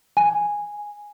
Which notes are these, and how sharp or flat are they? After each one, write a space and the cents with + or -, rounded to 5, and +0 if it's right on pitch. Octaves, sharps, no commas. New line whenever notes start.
G#5 -10